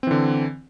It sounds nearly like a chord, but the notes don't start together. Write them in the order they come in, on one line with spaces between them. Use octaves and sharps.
C4 E3 D3